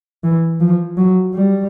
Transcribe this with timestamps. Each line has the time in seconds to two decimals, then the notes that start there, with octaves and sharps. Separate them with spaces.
0.24 E3
0.61 F3
0.97 F#3
1.35 G3